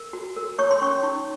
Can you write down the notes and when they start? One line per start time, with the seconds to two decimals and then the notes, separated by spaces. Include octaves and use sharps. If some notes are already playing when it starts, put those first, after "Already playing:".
Already playing: A#4
0.13 F#4
0.37 A#4
0.58 C#5 C#6
0.71 C6
0.82 C#4 C#6
1.03 D#4